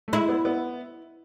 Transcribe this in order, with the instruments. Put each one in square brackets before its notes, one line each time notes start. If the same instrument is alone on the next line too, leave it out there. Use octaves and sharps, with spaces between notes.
[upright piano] A3
[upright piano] G#3 [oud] E4
[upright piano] B3
B3